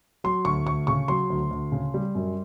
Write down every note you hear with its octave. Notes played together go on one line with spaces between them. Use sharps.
F#3 C6
D2 C#6
D2 C#6
C#3 C#6
F#3 C6
D2
D2
C#3
G3
F#2